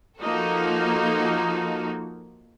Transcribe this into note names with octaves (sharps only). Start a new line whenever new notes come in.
F3 A#3 D#4 F4 F#4 A4